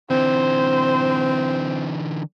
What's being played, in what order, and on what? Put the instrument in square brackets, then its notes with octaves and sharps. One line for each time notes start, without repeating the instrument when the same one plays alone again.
[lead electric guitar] D3 E3 [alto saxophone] C4 [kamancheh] C5